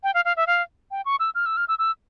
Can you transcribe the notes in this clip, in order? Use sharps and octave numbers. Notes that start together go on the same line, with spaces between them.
G5
F5
F5
E5
F5
G5
C#6
E6
F6
E6
F6
E6
E6